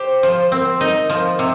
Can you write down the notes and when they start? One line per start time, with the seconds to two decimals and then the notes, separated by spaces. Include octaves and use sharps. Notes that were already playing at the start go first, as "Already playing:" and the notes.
Already playing: G4 C5
0.23 F3
0.52 C4 A#4
0.81 D#4
1.09 F3
1.39 C3